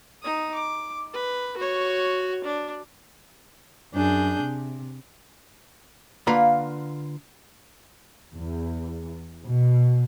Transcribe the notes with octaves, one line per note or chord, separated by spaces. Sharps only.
D#4 D#6
D6
B4
F#4 C#5
D4
F#2 D4 G#4 G6
C3
D3 A#3 F4 B4 A#5
E2
B2